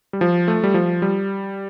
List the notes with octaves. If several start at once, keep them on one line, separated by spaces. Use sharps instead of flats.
G3
F3
A3
G3
F3
G3